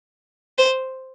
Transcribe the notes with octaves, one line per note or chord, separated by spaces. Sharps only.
C5